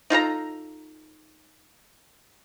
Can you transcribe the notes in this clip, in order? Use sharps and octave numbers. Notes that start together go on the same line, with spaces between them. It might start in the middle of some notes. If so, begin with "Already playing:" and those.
D#4 F4 A4 A#5